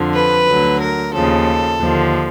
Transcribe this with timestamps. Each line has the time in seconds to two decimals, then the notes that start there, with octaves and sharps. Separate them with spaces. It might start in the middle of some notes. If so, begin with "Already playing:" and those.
Already playing: F2 D3 F3
0.14 B4
0.47 D2 D3 F#3
0.81 A#4
1.14 D#2 C#3 F3 A4
1.80 D#2 D3 F3